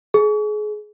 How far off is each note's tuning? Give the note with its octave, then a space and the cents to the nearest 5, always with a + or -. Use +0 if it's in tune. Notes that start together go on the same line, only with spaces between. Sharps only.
G#4 +30